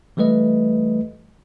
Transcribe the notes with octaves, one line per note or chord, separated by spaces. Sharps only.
E3 G3 A3 B4 D#5